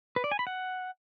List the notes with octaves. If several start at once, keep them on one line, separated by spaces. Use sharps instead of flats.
B4
D5
G#5
B5
F#5